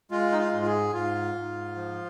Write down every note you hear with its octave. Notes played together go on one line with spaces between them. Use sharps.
G#3 F4
D#4
F4
G#2
F4
G#4
G#2 F4
G#2
F3